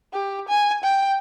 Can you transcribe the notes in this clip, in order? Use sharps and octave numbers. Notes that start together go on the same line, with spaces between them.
G4
G#5
G5